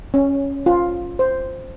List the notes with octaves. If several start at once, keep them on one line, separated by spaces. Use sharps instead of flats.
C#4
F4
C5